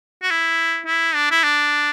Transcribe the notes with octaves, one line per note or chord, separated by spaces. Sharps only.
F#4
E4
E4
D4
E4
D4